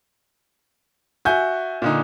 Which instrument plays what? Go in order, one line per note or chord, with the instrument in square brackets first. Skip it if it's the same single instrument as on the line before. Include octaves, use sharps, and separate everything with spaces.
[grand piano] F#4 [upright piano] E5 G#5 G6
[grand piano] A#2 D3 D#4